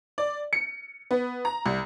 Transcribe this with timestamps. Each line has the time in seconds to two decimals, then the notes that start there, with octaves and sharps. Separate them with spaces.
0.18 D5
0.53 C#7
1.11 B3
1.45 A#5
1.66 C2